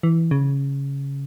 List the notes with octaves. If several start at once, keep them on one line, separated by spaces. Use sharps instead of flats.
E3
C#3